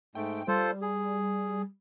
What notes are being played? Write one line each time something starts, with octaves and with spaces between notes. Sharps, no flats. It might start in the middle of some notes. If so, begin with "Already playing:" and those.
G#2 A3 G5
G3 F4 A4 C5
G#4